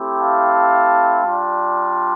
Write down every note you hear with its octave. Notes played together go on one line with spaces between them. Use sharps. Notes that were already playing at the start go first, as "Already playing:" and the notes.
Already playing: A3 C4 E4 G4
F5 A5
G3 D4 F4